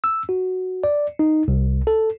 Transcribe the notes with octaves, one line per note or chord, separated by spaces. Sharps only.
E6
F#4
D5
D#4
C2
A4